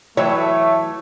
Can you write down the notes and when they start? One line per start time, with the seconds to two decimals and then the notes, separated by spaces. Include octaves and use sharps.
0.17 E3 F#3 A3 C#5 G5